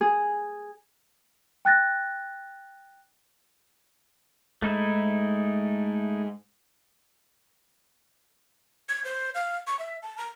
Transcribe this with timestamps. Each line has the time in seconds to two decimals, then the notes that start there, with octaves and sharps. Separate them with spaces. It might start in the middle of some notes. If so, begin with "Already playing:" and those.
0.01 G#4
1.65 G5 F#6 A6 A#6
4.62 G#2 A3 D#4 E4
8.89 G#6
9.05 C5
9.35 F5
9.67 C#6
9.79 E5
10.02 A5
10.17 A#5